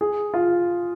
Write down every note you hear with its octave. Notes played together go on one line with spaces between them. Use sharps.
G#4
F4